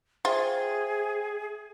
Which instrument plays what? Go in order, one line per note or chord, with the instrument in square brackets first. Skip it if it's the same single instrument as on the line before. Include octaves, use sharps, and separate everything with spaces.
[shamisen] F4 [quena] G#4 [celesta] C5 E5 G5